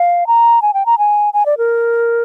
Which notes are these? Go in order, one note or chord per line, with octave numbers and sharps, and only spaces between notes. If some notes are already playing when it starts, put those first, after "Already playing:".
Already playing: F5
A#5
G#5
G5
A#5
G#5
G#5
D5
A#4